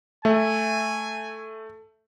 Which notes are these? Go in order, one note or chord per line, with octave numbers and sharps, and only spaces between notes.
A3 E5 G#5